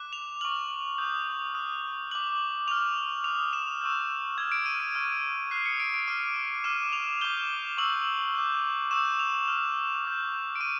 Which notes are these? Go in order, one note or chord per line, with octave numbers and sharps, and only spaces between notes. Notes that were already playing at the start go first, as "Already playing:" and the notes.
Already playing: D6 F#6
F7
C#6 F6 F#7
D#6 G6
D#6 F#6
D6 F#6 F#7
C#6 F6 F7
D#6 F#6 F7
E7
C#6 E6 G6
C#6 F6 G#6
D7
D#7
D7
C#6 F6
D#6 F#6 C7
C#7
D7
D7
D6 F6 D#7
D#7
D6 F6 E7
F7
D6 G6 G7
C#6 E6 G6 F#7
D6 G6
C#6 E6 G6 E7
F7
D6 F6
D6 G6
D7
C#6 D#7